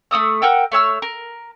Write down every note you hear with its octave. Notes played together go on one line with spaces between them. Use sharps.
A3 C#4 D#6 E6
A#4 F#5 G5 E6
A3 C#5 E6 F6
A#4